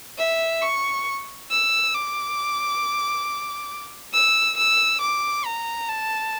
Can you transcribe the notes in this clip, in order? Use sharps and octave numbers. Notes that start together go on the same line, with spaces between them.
E5
C#6
E6
D6
E6
E6
D6
A#5
A5